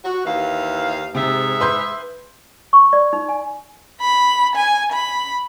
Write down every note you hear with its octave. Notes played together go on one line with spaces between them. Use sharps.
F#4
D#2 E3 F5
G#2 C3 G#4 E5
B4 C6 G6
C#6
D5
D#4
G#5
B5
G#5
B5